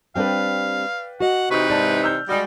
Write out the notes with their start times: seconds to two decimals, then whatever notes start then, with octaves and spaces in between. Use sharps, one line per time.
0.15 G3 C4 D4 B4 D5 F5 G5
1.20 F#4 D#5 F#5
1.51 C3 E3 D#4 B4 C#6 D#6
1.70 G#2 D5 A5
2.04 E6 F6 G6
2.29 G3 G#3 F#4 D#5